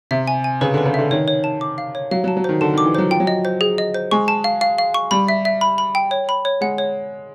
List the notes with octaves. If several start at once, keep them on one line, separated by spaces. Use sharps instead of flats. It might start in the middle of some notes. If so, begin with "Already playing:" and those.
C3 E5
G#5
G#5
C#3 B4
D3
B4
C#3
D3 E5
D#3 C#5
C#5
A5
D6
F5
C#5
F#3 F5
F#3
A5
F#3
D#3 C5
D3 A5
D#3
D6
E3
F#3 C5
F3 G5
F#3
D#5
C5
G#4
D#5
C5
G#3 C#6
A5
F5
F5
F5
C#6
G3 B5
E5
E5
B5
B5
G5
C#5
B5
C#5
G#3 F#5
C#5